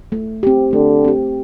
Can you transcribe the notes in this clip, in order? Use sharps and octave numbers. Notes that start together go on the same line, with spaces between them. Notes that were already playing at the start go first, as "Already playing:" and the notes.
A3
C4 G4
D3 A3
C4 G4